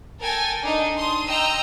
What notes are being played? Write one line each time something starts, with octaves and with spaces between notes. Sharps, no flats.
A4 A#4 G5 G#5 A6
D4 D#4
C6 D#6
D#5 G5 A#5 E6